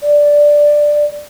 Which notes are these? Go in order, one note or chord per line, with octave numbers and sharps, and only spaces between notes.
D5